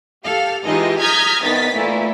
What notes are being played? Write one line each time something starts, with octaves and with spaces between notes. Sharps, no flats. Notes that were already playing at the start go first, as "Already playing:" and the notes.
G4 A4 F5
E3 G#3 D#4 F4 G4 D#5
A#5 D#6 F6 G6 G#6 B6
C2 D#3 B3 D#5 A6 B6
A#2 E3 A3 E4